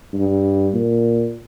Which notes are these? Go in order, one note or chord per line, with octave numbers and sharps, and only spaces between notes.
G2
A#2